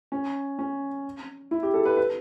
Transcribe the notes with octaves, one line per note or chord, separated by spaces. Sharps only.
C#4
C#4
E4
G4
A4
B4
B4